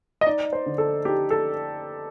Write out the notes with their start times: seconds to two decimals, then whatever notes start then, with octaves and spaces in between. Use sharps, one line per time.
0.21 D#5
0.26 D#4 D5
0.53 C5
0.66 D3
0.78 A4
1.05 D#4 G4
1.30 A4